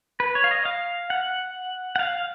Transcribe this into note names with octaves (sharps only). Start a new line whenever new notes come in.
B4
C#5
F5
D#5
F5
F#5
F#5
F5